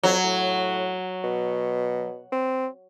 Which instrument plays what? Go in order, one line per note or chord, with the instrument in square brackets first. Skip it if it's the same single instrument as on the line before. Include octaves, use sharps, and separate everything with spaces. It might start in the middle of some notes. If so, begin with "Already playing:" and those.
[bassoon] F2 [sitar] F#3
[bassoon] A2
B2
C4